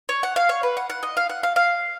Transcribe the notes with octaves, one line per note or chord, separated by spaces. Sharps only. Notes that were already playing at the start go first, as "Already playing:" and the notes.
C#5
F#5
F5
C#5
B4
F#5
F#5
D#5
F5
F#5
F5
F5